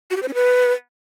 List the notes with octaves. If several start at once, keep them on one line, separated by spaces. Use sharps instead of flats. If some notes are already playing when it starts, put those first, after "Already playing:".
F#4
G4
C5
C#4
B4